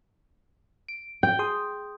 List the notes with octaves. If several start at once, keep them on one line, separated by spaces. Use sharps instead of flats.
D7
G5
G#4 C6 D#6